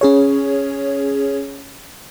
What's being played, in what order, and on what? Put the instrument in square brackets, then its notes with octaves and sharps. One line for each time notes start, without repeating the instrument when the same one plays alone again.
[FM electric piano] C#4 G#4 C#5